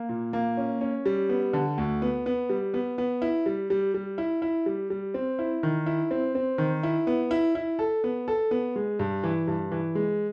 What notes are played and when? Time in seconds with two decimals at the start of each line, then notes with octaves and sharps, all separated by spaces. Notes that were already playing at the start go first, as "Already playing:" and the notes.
Already playing: A#3
0.09 A#2
0.33 A#3
0.57 C#4
0.81 C#4
1.06 G3
1.29 B3
1.53 D3
1.78 D2
2.02 B3
2.26 B3
2.50 G3
2.74 B3
2.98 B3
3.22 E4
3.46 G3
3.70 G3
3.94 G3
4.18 E4
4.42 E4
4.66 G3
4.90 G3
5.14 C4
5.39 E4
5.63 D#3
5.86 E4
6.11 C4
6.35 C4
6.58 D#3
6.83 E4
7.07 B3
7.31 E4
7.55 E4
7.79 A4
8.04 B3
8.28 A4
8.51 B3
8.76 G#3
8.99 G2
9.24 E3
9.48 G2
9.72 E3
9.95 G#3